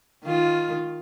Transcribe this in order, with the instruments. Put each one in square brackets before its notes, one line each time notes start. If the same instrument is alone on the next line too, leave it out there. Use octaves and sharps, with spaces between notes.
[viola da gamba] D#3 F4